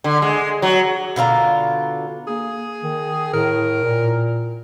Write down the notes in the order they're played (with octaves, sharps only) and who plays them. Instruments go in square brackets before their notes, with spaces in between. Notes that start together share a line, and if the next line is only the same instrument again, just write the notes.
[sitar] D3
G#3
F#3
[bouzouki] B2 D3 F4 A#5
[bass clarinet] A#3 [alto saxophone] G#4
[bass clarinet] D#3
[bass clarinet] A2 [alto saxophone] A#4
[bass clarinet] A#2